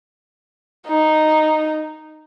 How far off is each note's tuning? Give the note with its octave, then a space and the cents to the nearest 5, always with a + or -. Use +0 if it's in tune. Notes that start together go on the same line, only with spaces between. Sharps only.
D#4 -5